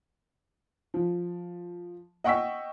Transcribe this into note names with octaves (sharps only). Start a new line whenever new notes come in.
F3
D#5 F#5 G5 C#6 E6 B6